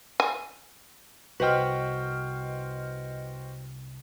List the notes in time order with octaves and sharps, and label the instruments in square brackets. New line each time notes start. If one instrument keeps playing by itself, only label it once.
[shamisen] G#5
[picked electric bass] C2 [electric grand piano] F#4 C5 G5 [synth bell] B4 D#5 F6